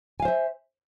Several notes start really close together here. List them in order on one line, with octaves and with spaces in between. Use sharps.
G#5 F5 C5 E5